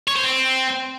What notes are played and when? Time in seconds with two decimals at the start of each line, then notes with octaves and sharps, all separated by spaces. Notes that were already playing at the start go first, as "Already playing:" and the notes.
0.08 C#5
0.16 C5
0.24 C4